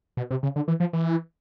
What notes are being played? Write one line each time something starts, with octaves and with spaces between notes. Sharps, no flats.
B2
C3
C#3
D3
E3
F3
E3